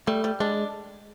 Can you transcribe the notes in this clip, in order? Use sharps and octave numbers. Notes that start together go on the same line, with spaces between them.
G3 A3
G3
G#3 D4